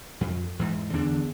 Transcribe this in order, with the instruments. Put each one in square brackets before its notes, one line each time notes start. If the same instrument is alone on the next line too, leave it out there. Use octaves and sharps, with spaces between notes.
[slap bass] F2
E2 G#2
[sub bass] E2 [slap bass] D3 E3 D4